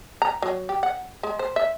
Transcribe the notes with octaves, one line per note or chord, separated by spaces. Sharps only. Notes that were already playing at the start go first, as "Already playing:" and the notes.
A#5
F#3
G4
F#5
G#3
C5
E5